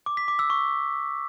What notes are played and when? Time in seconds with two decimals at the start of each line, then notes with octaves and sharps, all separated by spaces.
0.06 D6
0.17 B6
0.28 D6
0.39 E6
0.50 C#6